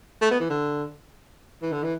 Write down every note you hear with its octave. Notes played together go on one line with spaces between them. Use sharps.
A3
B3
E3
D3
E3
D3
E3